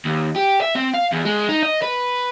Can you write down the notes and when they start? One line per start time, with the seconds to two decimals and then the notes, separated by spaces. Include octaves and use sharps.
0.05 D#2
0.36 G4
0.61 E5
0.75 C4
0.93 F5
1.12 E2
1.25 G#3
1.49 D#4
1.63 D#5
1.82 B4